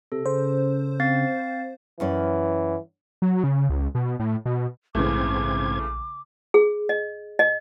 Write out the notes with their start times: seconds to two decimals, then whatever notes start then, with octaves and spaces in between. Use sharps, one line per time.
0.12 C3 A4
0.26 C#3 C5
1.00 C4 F5 A6
2.00 F#2 E3 C#4 D5
3.22 F#3
3.44 C#3
3.70 C#2
3.95 B2
4.20 A2
4.46 B2
4.95 A#1 G#2 C#3 E3 A3 C4 D6 G#6
6.54 G#4
6.89 D#5
7.39 D#5